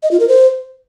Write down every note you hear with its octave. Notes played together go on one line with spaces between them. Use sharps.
D#5
F4
A#4
C5